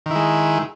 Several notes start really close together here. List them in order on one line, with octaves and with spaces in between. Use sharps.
D#3 E4 G#3